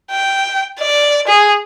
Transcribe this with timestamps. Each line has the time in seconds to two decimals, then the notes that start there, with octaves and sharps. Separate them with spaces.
0.11 G5
0.79 D5
1.28 G#4